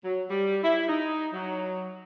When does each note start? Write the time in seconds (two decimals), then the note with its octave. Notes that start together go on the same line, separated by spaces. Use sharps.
0.04 F#3
0.29 G3
0.63 E4
0.88 D#4
1.33 F#3